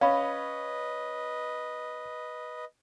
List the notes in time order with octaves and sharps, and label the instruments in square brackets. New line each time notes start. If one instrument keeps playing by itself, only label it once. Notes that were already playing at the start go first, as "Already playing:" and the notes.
[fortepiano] C#4 [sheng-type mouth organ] B4 D#5 [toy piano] F5 B5